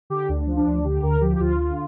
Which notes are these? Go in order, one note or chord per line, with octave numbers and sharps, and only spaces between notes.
D3 G4
D2 D4
F3
D4
D2
D3 G4
D2 A#4
F3 G4
G4
D2 F4
D3